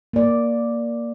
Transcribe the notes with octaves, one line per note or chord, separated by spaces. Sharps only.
A#3 D5